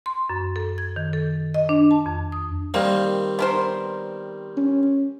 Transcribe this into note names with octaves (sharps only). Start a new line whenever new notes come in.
C6
F#2
A4
G#6
D#3
A4
D#5
D4
A5
F2
D#6
D#3 G3 A#3 C4
B3 A#4 C5
C#4